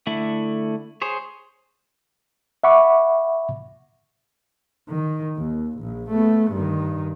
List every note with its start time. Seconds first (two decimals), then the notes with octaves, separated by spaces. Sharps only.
0.07 D3 A3 E4
1.02 G#4 C5 C#5
2.64 E5 F#5 B5 C#6 D6
4.89 D#3
5.37 D#2
5.78 A#1
6.10 A3 B3
6.51 G2 D#3